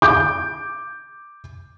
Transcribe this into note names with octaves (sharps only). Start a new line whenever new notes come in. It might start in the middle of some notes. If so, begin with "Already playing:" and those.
D6 G6